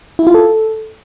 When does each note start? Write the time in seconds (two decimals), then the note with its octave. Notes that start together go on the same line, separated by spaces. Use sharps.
0.19 E4
0.27 F4
0.34 A4